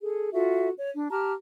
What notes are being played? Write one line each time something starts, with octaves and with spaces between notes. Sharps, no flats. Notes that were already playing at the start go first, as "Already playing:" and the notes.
G#4 A4
F4 F#4 A4 E5
C#5
D4
G4 A5 A#5 F6